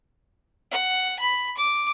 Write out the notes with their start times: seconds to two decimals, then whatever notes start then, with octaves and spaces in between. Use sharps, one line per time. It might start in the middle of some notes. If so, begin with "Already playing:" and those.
0.72 F#5
1.20 B5
1.57 D6